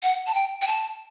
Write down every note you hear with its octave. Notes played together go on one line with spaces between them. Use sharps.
F#5
A5
G5
G5
A5